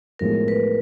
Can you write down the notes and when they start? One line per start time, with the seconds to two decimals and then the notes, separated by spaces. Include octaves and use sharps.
0.19 B1 A2 F3 G#3 A#4
0.48 B4